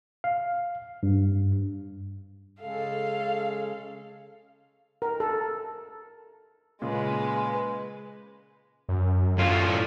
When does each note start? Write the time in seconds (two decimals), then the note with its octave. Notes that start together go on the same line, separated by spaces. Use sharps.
0.24 F5
1.03 G2
2.62 C#3 G#3 A4 F5
5.02 A#4
5.20 A4
6.82 A#2 C#3 G#3 B4
8.89 F#2
9.38 A2 F4